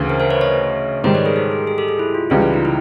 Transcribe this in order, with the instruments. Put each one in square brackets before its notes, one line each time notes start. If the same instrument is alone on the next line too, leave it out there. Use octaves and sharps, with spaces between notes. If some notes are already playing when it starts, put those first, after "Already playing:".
Already playing: [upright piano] D2 C#3 E3
[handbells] A#4 C5
A#4 C5
B4 C#5
C#5 D#5
[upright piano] G#2 D#3 G3 [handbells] C5 D5
[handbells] B4 C#5
G#4 A#4
G4 A4
G#4
G#4
G4 A4
G#4
E4
F4
[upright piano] C#2 C#3 E3 G3 [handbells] F4
[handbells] E4
D#4
E4